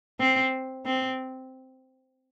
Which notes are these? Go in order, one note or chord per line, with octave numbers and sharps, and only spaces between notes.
C4
C4